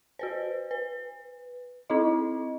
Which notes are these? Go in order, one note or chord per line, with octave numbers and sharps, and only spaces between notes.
F#4 B4 C5
B4
C4 D#4 E4 D#5